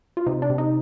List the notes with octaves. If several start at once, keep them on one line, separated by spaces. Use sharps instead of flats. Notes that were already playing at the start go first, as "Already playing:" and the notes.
F4
C3 D#4
D4
C3
D#4